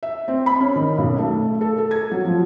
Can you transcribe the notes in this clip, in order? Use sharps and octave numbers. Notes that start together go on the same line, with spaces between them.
E5
C4
B5
C#4
D#3
B1
A3
A4
A4
G#6
F#3
F3